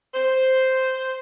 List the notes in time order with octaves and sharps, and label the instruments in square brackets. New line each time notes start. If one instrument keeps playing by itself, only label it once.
[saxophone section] C5